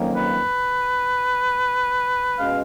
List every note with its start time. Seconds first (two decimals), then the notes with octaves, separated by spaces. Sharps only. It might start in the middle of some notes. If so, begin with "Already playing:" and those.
Already playing: F2 D#3 F#3 A#3 C#4
0.13 B4
2.39 B2 G#3 C#4 F5